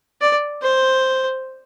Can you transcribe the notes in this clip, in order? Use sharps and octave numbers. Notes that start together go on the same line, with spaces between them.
D5
C5